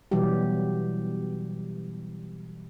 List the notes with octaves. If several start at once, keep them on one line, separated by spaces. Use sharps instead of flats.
B2 E3 F#3 G3 G4